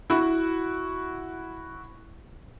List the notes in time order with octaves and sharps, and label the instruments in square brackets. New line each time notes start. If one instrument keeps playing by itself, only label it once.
[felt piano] E4 F#4